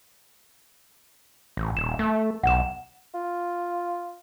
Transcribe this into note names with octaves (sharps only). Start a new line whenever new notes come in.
A1
D#1 E7
A3
B1 F#5 E7
F4